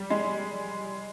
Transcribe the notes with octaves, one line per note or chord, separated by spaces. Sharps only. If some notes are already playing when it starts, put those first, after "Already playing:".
Already playing: G3
G#3